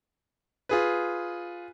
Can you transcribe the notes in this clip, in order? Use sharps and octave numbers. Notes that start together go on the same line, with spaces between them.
F4 G#4 B4